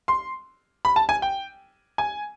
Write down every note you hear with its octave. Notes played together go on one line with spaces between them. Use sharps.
C6
B5
A5
G#5
G5
G#5